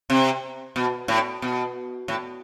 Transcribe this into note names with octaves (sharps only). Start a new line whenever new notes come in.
C3
B2
A2
B2
A2